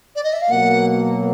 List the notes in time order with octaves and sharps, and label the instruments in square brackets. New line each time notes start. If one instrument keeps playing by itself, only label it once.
[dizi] D5
D#5
E5
F5
[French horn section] B2 F#3 A#3 [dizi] F#5